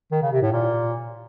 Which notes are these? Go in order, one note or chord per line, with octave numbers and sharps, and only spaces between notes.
D#3
C#3
C3
A2
A#2